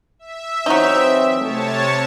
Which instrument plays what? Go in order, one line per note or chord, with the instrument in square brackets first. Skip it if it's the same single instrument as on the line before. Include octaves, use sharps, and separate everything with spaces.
[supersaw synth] E5
[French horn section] E3 C4 [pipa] F#3 D#4
[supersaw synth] C3 C#5 A5 [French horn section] A3